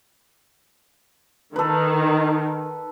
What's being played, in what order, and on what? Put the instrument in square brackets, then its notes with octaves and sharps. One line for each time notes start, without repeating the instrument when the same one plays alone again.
[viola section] D#3 [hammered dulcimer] A4 B4